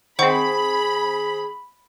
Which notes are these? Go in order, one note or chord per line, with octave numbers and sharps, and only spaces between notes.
D#3 C4 G#4 C5 F#5 B5 C#6